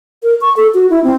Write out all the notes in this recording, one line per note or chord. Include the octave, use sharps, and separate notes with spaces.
A#4
C#6
A4
F#4
E4
C4